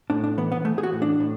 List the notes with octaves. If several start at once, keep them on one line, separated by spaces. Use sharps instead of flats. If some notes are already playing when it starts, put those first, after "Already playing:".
A2 D4
D4
E3 B3
B3
E3 A3
G#4
F#4
A2
D4
A2